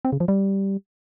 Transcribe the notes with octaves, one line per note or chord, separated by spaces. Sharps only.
C4
C#3
F3
G3